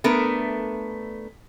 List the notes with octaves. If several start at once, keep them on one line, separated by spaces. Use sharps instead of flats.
A3 B3 D4 A#4